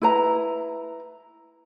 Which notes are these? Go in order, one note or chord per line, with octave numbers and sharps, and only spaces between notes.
E4 B4 A#5